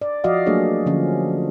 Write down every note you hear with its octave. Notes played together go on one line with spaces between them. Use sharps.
D5
F3 F#4 D5 D#5 F5
F#3 A3 A#3 D4 G#4 C#5
D3 F3 C#4